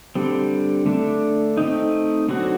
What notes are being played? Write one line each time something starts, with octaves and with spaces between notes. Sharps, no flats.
D3 G3 C4
D3 A3 D4
A3 C4 D#4
D3 F#3 C4 F#4